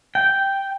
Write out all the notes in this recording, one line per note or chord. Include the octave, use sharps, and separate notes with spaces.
G5